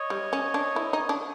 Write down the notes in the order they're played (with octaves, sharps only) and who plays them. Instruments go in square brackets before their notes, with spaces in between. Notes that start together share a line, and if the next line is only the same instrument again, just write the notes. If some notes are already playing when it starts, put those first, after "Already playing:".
Already playing: [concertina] C#5 D#5
[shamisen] G3
C#4
D4
E4
D#4
D4